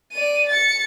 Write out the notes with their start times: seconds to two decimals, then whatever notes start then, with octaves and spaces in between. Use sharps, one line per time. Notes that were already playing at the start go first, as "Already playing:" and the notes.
0.13 D5 D#7
0.50 A6 C#7